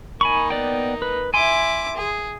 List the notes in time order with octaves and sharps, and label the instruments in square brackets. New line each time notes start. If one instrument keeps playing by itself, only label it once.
[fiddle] A#3 D#4 [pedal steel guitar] G#5 B5 C#6
[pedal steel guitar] B3 D5 G5
B4
[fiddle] E4 D6 [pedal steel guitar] G#5 C6
[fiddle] G#4